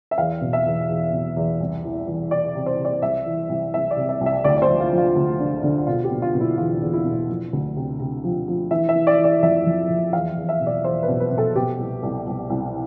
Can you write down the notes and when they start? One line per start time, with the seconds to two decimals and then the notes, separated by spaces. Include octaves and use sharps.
0.11 E5
0.18 E2 F5
0.41 B2
0.53 E5
0.66 E2
0.89 E2
1.13 B2
1.36 E2
1.60 C2
1.84 E3
2.08 E3
2.31 E3 D5
2.55 C3
2.66 C5
2.78 C3
2.85 D5
3.02 C2 E5
3.26 E3
3.49 C2
3.73 C2 E5
3.91 D5
3.97 C3
4.09 E5
4.21 C2
4.26 E5
4.44 D2 D5
4.57 D5
4.62 C5
4.68 F3
4.80 F4
4.92 F3
4.98 F4
5.16 D2
5.39 D3
5.63 D3
5.87 B2 F4
6.04 G4
6.10 B2
6.22 F4
6.34 B2
6.40 E4
6.58 E2 F4
6.81 E2
6.93 E4
7.05 B2
7.29 F3
7.53 D2
7.76 C3
8.00 C3
8.24 F3
8.48 F3
8.70 E3 E5
8.89 E5
8.95 E3
9.07 D5
9.18 E3
9.24 D5
9.43 F2 E5
9.66 F2
9.90 F2
10.13 E2 F5
10.37 E2
10.49 E5
10.60 B2
10.67 D5
10.84 E2 C5
11.03 B4
11.08 B2
11.20 B4
11.31 B2
11.38 A4
11.55 B2 G4
11.79 C2
12.03 C2
12.27 C2
12.50 C2